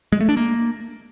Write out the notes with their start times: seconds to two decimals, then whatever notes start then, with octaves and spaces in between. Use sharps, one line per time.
0.12 G#3
0.21 A3
0.29 D4
0.37 A#3